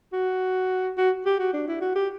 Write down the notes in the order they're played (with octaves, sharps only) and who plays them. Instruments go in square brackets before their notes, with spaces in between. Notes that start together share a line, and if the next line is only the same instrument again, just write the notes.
[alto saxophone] F#4
F#4
G4
F#4
D4
E4
F#4
G4